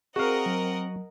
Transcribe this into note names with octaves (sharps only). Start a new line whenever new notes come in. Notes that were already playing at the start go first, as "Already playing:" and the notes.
C4 F#4 G#4 A#4 D#5 F5 F#5
F#3